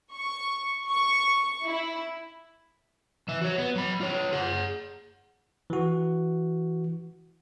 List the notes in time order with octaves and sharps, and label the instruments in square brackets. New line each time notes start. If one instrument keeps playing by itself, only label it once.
[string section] C#6
C#6
E4
[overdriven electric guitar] E3 E5
F#4 C#5
B3
F#3 B5
F4 C#5
G#4 F#5
[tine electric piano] E3 F#4